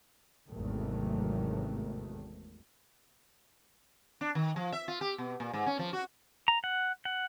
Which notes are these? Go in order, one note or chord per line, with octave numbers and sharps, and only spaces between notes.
G#1 E2 C3 D#3 F#3 A3
D4
D#3
F3
E5
F4
G4
B2
A#2
G#2
C#4
F3
F#4
A#5
F#5
F#5